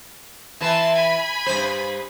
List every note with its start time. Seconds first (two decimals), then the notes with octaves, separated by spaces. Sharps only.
0.61 E3 B4 A5 C6
0.95 G#5 B5
1.46 G2 C5